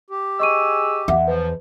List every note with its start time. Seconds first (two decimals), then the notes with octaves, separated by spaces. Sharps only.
0.10 G4
0.39 G#4 D#5 C#6 E6 D#7
1.08 E2 E5 F#5
1.27 G#2 F3 B4